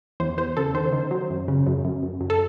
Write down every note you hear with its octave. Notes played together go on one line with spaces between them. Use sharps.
E2 C5
E2 C5
C#3 A4
D#3 C5
D#3
F#3
F#2
C#3
F#2
F#2
F#2
F#2
A4